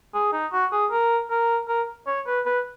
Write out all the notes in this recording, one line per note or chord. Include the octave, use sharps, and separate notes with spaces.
G#4
D#4
F#4
G#4
A#4
A#4
A#4
C#5
B4
B4